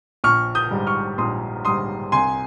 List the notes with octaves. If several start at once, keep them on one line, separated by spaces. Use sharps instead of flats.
A#1 C#6 F6
D#6 G6
G#2 G3
C#6 F6
A#1 C6 D#6
G#2 G3 C6 D#6
C2 G#5 C6